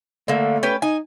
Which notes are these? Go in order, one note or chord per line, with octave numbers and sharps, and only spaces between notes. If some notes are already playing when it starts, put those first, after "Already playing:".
D3 A3 A#3
C#4 G4 B4
D#4 G#5